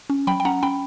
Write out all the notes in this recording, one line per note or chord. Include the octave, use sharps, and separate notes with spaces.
C#4
F#3 G5 B5
G5
C#4 F#5 A#5
C#4 G5 B5